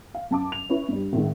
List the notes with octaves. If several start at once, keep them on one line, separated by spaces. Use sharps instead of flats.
F5
F#2 A5 D6
F7
C#4 E4 B4
G2 G3
G#1 A2 D#3 G#3